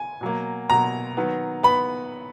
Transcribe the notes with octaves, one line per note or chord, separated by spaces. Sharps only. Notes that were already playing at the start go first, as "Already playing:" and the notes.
Already playing: G#5
B2 F#3 A#3
B2 F#3 A#3 A#5
D#3 F#3 B3
B3 B5